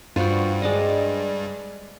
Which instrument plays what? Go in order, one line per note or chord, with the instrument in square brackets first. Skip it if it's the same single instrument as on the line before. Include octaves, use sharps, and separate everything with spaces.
[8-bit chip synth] G2 [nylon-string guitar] F4 F#4 [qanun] C5 G5
[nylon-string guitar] G3 [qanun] G#3 D5 D#5